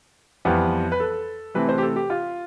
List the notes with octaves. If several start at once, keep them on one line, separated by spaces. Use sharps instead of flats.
F2 E3 G3 B3
B4
A4
C3 E3 A3 C4 B4
C5
G4
A4
G4
F4